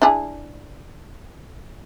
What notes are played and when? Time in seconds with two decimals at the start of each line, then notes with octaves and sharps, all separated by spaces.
0.02 D4 E4 G#4